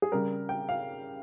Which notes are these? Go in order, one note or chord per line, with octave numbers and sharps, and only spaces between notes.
G#4
C#3 G3 A#4
G5
F5